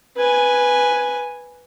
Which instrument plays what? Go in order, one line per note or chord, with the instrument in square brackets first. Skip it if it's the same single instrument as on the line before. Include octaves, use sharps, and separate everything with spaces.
[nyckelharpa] B4 G#5